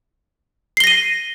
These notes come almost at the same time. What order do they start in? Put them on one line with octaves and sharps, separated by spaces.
C7 G7 A#6 D#7